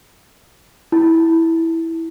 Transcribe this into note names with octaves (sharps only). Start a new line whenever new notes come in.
E4